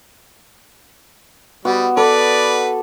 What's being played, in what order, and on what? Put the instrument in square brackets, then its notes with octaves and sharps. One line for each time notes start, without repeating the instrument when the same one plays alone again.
[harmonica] G3 [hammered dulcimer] B3 F#4
[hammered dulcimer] A4 B5 D6 [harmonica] B4 D5